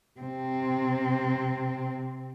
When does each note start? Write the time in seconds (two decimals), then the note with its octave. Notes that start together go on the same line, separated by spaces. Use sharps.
0.21 C3 C4